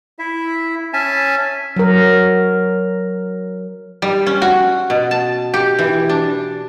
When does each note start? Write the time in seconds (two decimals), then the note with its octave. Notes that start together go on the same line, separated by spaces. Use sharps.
0.19 E4 E5
0.93 C#4 E5 G#5 A5
1.76 F#3 A#4
4.02 G3
4.27 C#4
4.42 F#4
4.90 B2
5.11 A5
5.54 G4
5.79 E3
6.09 D4